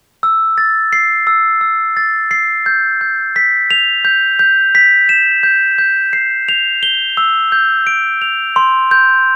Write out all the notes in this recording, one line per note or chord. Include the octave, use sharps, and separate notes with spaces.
E6
A6
C7
E6
E6
A6
C7
G6
G6
B6
F7
G6
G6
B6
E7
G6
G6
C7
F7
G7
E6
G6
D7
F7
C6
G6